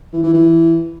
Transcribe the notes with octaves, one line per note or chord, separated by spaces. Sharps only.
E3
E3
E3